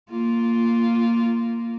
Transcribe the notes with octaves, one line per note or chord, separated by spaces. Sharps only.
A#3 F4